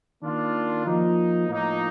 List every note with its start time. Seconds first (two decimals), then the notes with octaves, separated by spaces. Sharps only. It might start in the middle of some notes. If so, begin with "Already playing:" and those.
0.23 D#3 A#3 D4 F4
0.86 F3 A#3 D#4
1.49 A2 F3 A#3 D#4